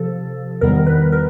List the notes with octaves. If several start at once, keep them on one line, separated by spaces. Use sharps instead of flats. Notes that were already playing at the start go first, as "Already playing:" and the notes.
Already playing: C3 F3 A4
E2 C3 D#3 G3 B3 A#4
B4
A#4